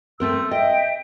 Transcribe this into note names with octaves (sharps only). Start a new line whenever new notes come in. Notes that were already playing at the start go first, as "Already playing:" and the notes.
A3 C4 A#4 E6
D#5 E5 G5